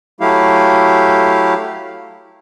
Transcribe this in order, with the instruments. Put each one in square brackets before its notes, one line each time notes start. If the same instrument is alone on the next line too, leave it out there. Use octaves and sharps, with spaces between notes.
[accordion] F#3 A3 E4 G4 F5